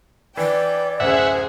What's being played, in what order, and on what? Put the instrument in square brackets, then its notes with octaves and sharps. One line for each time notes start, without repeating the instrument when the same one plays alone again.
[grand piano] E3 [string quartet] B4 G5 [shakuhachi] D5
[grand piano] D1 F#2 [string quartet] G#4 C5 [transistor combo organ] E5 F#5